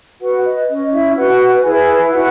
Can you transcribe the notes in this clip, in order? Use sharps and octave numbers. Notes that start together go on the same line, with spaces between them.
F#4 B4 F#5
D#5
C#4 D#5
E4 E5
F#4 B4 F#5
E4 G#4 G#5
E4 F#4 F#5